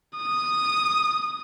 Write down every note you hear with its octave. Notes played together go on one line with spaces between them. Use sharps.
D#6